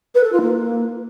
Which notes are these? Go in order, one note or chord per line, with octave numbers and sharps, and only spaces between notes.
B4
A4
F4
A#3